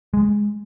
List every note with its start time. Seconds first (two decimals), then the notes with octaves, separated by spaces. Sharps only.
0.14 G#3